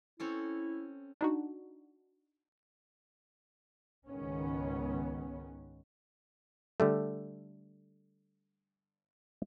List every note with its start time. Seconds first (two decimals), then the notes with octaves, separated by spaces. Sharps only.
0.20 C4 C#4 E4 A4
1.21 D4 D#4 F#4
4.08 C#2 G#2 D#3 B3 C#4
6.80 D3 G3 A3